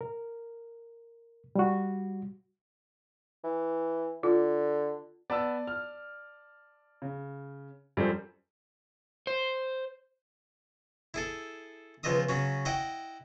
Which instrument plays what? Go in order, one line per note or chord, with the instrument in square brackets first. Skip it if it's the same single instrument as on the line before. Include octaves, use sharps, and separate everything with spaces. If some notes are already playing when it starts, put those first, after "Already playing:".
[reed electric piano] A#4
G3 F#4
[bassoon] E3
[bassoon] D3 [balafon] F4
[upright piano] B3 E6 [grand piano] D5 A5
[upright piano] F6
[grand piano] C#3
[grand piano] F#2 G3 [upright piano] F3 A4 C5
[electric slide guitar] C5
[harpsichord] E4 G#4 A4
C#2 F3 B3 D#5 E5 D#6
C#3 F#3 C#4
E4 D#5 F#5 G5